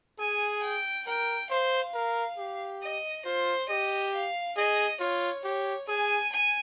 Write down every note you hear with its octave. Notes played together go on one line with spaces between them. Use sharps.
G#4 G#5
G5
A#4 G5
C5 F5
A#4
G4
D#5
F4 C5
G4 D#5
F5
G#4 D#5
F4 C#5
G4 C#5
G#4 G#5
G#5